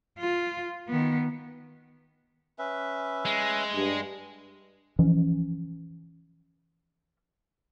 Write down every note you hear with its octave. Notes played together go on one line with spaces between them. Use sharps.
F4
D#3 B3
C#4 B4 E5
G#3
G2
E3 F3 C#4